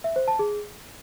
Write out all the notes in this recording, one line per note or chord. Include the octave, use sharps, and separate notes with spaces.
E5
C5
A5
G#4